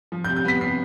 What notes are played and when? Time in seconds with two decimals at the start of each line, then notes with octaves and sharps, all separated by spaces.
0.12 F3
0.24 G6
0.28 C3
0.36 G6
0.45 B3 B6
0.60 C3 C7